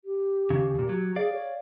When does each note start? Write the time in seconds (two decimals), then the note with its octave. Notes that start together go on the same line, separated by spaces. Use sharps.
0.05 G4
0.50 D#2 C#3
0.75 D#2 A#2
0.89 F#3
1.16 G#4 D5 F5
1.33 C#5